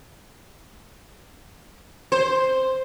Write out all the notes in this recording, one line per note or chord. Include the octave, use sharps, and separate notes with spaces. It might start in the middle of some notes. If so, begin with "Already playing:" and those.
C5